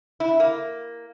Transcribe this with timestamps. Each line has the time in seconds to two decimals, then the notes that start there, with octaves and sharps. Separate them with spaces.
0.20 E4
0.40 A#3